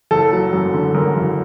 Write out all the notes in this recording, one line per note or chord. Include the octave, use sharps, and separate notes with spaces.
F#1 A4
F#3
F#2
D3
F#2 A#4
F#1